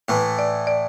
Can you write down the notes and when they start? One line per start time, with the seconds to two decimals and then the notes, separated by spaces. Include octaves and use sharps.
0.09 A2 E3 A3 B4
0.39 D5
0.67 D5